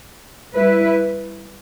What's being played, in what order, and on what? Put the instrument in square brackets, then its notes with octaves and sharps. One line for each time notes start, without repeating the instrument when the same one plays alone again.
[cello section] G3 E4 B4